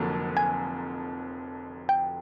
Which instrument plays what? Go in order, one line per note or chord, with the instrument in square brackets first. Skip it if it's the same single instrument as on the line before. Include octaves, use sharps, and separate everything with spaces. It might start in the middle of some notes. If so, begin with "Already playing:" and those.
Already playing: [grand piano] F1 F2 D3 F#3 A#3
[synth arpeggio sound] G#5
G5